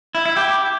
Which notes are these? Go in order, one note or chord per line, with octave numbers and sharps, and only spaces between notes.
E4
E4
G4